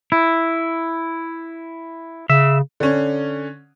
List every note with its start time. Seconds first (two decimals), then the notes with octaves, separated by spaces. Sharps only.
0.12 E4
2.30 C#3 E5
2.80 D3 C#4